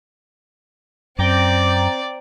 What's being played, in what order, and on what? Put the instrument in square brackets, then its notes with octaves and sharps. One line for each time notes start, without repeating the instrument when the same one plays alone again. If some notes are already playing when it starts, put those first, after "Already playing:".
[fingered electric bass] F#2 [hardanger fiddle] C4 D5 [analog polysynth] G5 A#5 D6